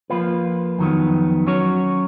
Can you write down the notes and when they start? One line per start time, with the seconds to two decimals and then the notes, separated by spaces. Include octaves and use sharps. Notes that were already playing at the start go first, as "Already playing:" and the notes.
0.10 F3 A#3 F4 B4
0.79 F2 D#3 F#3 B3
1.47 F#3 C#4 F#4 C#5